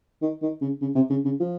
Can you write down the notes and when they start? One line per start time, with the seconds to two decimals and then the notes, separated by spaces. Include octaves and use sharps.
0.22 D#3
0.42 D#3
0.61 C#3
0.82 C#3
0.95 C3
1.10 C#3
1.25 C#3
1.40 F3